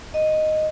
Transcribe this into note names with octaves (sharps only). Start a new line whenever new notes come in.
D#5